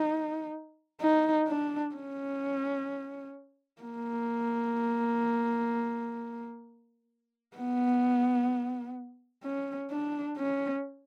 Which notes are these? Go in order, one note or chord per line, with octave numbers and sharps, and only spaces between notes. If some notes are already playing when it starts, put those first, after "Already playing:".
Already playing: D#4
D#4
D4
C#4
A#3
B3
C#4
D4
C#4